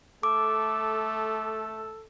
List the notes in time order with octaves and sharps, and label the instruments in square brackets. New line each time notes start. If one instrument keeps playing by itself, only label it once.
[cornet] A3 [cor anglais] A4 [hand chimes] D6